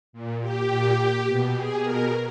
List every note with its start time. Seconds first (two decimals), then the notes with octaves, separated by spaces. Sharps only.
0.13 A#2
0.41 G4
0.70 A#2
1.27 B2
1.55 G#4
1.83 B2 A#4